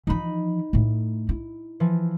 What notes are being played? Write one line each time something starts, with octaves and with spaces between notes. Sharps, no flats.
E3 F3 D#4 B5
A2 A3
E4
E3 F3